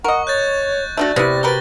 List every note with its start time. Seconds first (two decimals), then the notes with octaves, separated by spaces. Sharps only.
0.04 A#4 D#5 F#5 C#6
0.27 C#5 F#6 G6 A6
0.97 A3 D4 F#4 D5
1.16 C3 B3 E4 A#6
1.43 F#4 A#4 B4 A6 G7